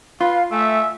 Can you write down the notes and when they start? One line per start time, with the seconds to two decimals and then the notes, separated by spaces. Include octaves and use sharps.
0.21 F4 B4 F5
0.51 A3 E5 G#5